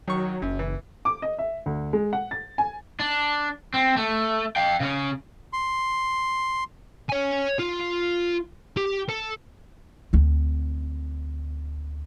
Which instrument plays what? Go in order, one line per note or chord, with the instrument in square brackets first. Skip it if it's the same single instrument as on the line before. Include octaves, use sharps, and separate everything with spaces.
[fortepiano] D#3 C#6 [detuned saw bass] F#3
[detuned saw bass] F#1 [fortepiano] F#2
[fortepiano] E3
[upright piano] D6
D#5
E5
D2
G#3
F#5
A6
G#5
[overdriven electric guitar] D4
C4
A3
F5 G5
C#3 C#4
[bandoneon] C6
[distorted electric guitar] C#5 G#5
F4
G4
A4
[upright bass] D2 C4